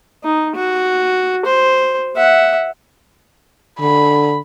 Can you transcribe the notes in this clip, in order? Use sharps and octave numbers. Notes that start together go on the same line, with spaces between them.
D#4
F#4
C5
E5 F#5
D3 B5